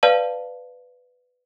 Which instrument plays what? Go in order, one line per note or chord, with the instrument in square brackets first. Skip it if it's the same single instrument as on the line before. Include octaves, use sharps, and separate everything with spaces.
[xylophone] B4 D5 F5 A5